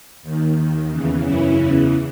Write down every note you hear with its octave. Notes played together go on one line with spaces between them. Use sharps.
D#2 D#3
D#2 D#3
E2 C#3 E3
F#2 C#3 E3 C#4 E4
E2 C#3 E3